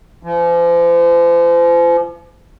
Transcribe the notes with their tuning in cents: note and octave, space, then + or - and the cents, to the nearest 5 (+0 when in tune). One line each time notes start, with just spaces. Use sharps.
F3 -40